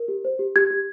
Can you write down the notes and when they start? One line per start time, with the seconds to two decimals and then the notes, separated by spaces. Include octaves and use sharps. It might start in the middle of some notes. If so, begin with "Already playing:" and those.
Already playing: A#4
0.08 G4
0.25 C5
0.39 G4
0.56 G4 G#6
0.71 G4